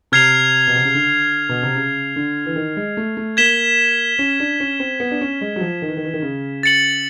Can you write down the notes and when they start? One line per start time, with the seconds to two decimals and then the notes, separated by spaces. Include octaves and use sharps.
0.12 C3 F6 G#6 C7 F7
0.67 B2
0.76 C3
0.85 C#3
0.94 D3
1.49 B2
1.63 C3
1.75 C#3
2.16 D3
2.46 E3
2.56 D#3
2.77 G#3
2.97 A3
3.17 A3
3.37 A#3 G#6 B6 E7 G7
4.19 C#4
4.40 D4
4.60 C#4
4.80 C4
5.00 B3
5.11 D4
5.21 C#4
5.41 G#3
5.56 F#3
5.61 F3
5.82 D#3
5.89 E3
5.97 D#3
6.05 E3
6.13 D#3
6.22 C#3
6.63 A6 C#7 F#7